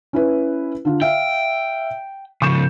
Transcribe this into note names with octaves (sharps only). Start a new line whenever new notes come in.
C#4 E4 B4
D3 F4
E5 F5 G5
C#3 F3 C#6 G6 E7